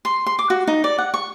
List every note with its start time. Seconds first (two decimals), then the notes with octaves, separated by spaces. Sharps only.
0.05 C6
0.26 C6
0.39 D6
0.50 F#4
0.67 D#4
0.84 D5
0.98 F#5
1.14 C#6